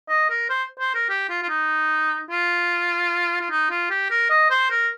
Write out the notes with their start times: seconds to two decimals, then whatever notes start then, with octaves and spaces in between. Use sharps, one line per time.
0.09 D#5
0.29 A#4
0.50 C5
0.80 C5
0.94 A#4
1.09 G4
1.29 F4
1.43 F4
1.49 D#4
2.30 F4
3.41 F4
3.50 D#4
3.70 F4
3.90 G4
4.10 A#4
4.30 D#5
4.50 C5
4.70 A#4